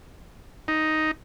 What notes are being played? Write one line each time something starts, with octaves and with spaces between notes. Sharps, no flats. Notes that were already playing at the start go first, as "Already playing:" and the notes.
D#4